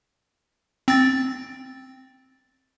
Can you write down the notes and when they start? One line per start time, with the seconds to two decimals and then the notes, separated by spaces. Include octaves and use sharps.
0.88 C4 A6